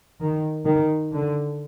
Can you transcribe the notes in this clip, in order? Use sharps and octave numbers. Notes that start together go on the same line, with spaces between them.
D#3
D#3
D3